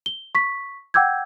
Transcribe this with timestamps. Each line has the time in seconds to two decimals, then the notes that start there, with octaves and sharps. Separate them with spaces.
0.06 G7
0.35 C#6 B6
0.94 F#5 G5 D6 E6 G6 G#6